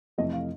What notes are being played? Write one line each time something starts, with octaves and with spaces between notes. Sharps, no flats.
F2 C3 E3 A3 D#5
F5